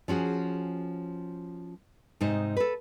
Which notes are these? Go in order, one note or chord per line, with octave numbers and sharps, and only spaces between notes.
F3 C#4 F#4 G#4
G#2 C3 D#4 C5 D#5
A4 B4